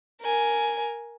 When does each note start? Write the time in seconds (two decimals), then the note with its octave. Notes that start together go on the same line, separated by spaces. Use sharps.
0.21 A#4 G#5